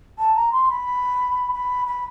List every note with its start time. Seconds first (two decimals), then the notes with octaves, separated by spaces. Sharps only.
0.18 A5
0.35 A#5
0.52 C6
0.70 B5
1.53 B5
1.86 B5